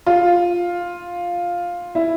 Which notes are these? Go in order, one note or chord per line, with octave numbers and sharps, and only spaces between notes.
F4
E4